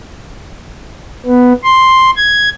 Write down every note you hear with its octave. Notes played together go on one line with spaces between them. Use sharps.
B3
C6
G#6